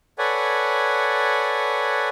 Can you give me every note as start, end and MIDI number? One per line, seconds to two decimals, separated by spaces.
0.18 2.09 69
0.18 2.09 71
0.18 2.09 73
0.18 2.09 74
0.18 2.09 78
0.18 2.09 80